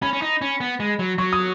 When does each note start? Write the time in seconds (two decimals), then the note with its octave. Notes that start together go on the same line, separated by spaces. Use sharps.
0.02 C#4 B5
0.13 C#4
0.22 D#4
0.42 C#4
0.60 B3
0.80 G#3
0.99 F#3
1.18 F#3 C#6
1.33 D#6